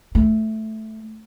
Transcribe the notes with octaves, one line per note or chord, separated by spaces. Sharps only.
A3